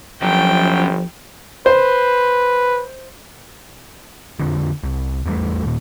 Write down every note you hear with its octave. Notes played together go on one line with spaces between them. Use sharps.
G1 F#2 F3 F#3 G5
B4 C5
F2 D3 F3
C2
E2 G3 A3
D#2 A#2